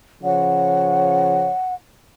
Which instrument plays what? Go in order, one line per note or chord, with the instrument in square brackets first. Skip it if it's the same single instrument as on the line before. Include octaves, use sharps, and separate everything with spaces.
[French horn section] C#3 F3 C#5 [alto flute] F#5